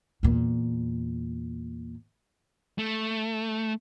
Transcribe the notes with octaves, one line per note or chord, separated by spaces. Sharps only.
E2 A#2
A3